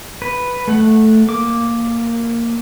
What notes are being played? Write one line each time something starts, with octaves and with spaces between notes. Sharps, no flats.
B4
A3 F#5
A#3 D6